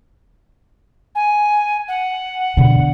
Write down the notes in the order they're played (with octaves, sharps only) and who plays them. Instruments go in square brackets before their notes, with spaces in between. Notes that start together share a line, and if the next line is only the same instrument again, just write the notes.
[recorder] G#5
F#5
[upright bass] B2 D3